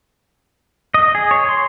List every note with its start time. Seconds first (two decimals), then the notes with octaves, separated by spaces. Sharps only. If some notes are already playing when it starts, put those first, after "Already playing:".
0.94 D#5
1.15 G#4
1.31 C#5
1.49 C6